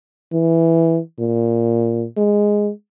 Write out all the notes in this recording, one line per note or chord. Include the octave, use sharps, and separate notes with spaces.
E3
A#2
G#3